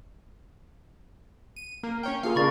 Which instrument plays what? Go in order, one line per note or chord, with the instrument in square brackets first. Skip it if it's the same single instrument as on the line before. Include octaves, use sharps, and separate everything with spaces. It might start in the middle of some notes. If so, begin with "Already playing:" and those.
[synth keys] D#7
A#3
C#4 C#5 G5
[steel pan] A#3 F4 G#4 [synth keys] F5
[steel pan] C#3 D4 A#4 [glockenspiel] B5 C#6 A6